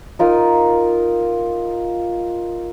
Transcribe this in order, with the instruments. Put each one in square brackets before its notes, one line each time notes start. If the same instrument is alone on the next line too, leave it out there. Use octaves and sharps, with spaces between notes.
[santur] D#4 F4 A#4 D#6